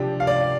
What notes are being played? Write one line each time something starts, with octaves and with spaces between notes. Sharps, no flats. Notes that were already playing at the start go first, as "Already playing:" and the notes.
Already playing: C3 F3 D4 G4
F5
D5